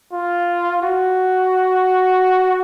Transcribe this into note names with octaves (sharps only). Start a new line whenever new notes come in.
F4
F#4